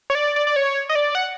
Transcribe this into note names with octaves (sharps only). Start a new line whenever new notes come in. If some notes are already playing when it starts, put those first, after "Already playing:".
C#5
D5
D5
D5
C#5
D#5
D5
F#5